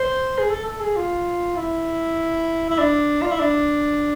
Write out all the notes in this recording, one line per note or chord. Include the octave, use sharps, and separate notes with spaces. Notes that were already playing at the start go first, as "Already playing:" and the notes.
Already playing: C5
G#4
A4
A4
G#4
F4
E4
E4
D4
F4
E4
D4